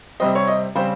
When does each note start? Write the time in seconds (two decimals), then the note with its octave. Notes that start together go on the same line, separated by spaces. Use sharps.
0.20 C3 G3 C4 D#5
0.35 C#5
0.47 D#5
0.75 C#3 G3 C4 C5